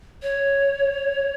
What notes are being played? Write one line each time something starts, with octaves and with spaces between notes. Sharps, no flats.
C#5